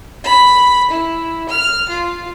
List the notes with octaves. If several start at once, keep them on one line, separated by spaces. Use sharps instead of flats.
B5
E4
F6
F4